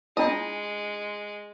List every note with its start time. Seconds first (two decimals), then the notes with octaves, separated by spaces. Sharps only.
0.17 G#3 D4 E4 F4 D#5